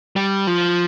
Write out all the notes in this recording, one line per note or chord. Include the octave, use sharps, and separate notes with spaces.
G3
F3